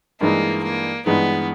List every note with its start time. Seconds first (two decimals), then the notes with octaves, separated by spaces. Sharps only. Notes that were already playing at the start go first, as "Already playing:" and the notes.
0.21 G2 E3 G#3 A#3 D#4
0.64 A#3
1.06 G2 E3 G#3 B3 D#4